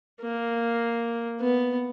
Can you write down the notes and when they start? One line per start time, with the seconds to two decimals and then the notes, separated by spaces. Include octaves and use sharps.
0.22 A#3
1.39 B3